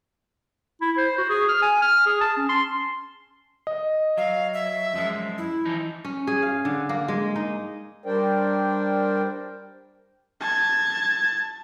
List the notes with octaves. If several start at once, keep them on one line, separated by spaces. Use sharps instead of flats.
E4
C5
F#4
G#4
F6
G#5
F6
G#4
A5
C#4
C6
D#5
F#3 F5
E5
F#2 F3 G#3
E4
E3 F3 D#4
C#4
G#4
F5
D3
A#3
G#3
D#4
G3 D4 A#4 C5 D5 G5
A5 G#6